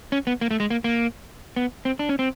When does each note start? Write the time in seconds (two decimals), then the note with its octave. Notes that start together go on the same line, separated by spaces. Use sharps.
0.12 C#4
0.27 B3
0.41 A#3
0.51 A3
0.60 G#3
0.70 A#3
0.84 A#3
1.56 B3
1.85 C4
1.99 D4
2.09 C#4
2.19 C4